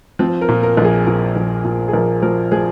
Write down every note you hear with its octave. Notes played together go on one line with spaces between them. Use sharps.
F3 C4
A#4
A#2
A#4
A#1
G#4
A#2 A#4
A#1
A#2
G#4
A#1 A#4
F3 A#4
F3 G#4